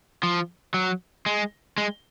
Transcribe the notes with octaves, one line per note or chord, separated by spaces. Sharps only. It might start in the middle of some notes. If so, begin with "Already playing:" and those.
F3
F#3
G#3
G#3